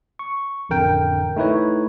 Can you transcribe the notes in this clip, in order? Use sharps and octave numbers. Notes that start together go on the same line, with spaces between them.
C#6
A1 F2 D3 A#4 G5
A3 D#4 E4 B4 C#5